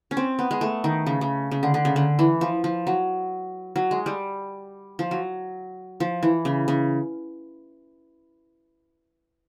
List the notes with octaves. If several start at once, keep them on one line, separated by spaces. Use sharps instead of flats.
C#4
C4
B3
G#3
A3
D#3
C#3
C#3
C#3
D3
D3
C#3
D3
E3
F3
F3
F#3
F#3
G#3
G3
F3
F#3
F3
E3
C#3
C#3